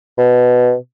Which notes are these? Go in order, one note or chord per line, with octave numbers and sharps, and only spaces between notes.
B2